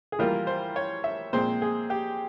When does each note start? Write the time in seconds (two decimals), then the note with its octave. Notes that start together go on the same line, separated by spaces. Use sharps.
0.12 G#4
0.19 E3 G3 A#3 F4 A#4
0.47 C5
0.76 C#5
1.04 E5
1.33 A#2 G#3 C4 C5
1.62 G#4
1.90 G4